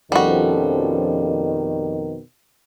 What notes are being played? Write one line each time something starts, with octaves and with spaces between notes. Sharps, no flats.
F2 B2 D#3 F3 G3 C#4 F#4 A4